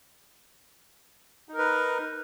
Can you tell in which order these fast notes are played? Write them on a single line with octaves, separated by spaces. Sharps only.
D#4 A#4 B4